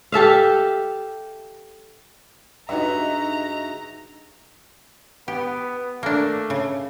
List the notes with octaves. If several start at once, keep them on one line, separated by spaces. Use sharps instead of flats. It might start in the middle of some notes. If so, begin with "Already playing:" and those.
G4 A4 E5 F5
G2 C#3 G#3 D#4 F#4 E5 A#5
B3 G4
A3 A#3 D4
C#3